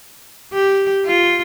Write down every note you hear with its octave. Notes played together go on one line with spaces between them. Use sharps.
G4
F4